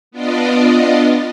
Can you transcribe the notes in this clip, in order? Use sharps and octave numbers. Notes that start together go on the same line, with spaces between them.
B3 D4 F4 D5 D#5